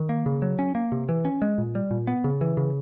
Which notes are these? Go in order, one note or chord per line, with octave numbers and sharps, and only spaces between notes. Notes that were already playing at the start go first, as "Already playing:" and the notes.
Already playing: D#3
A#3
C#3
F#3
C#4
A#3
C3
E3
C#4
G#3
A#2
G3
A#2
B3
C#3
E3
C#3